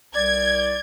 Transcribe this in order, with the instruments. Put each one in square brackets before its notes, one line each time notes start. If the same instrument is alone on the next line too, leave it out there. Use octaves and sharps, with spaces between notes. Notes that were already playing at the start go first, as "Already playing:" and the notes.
[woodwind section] C2 D5 [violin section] G#6